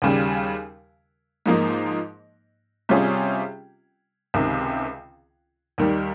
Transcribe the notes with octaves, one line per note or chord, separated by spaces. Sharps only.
D#2 C#3 G3
G#2 F3 A#3 D#4
C3 G3 C#4 F4 G#4
C#2 C3 D#3
D#2 D#3 G3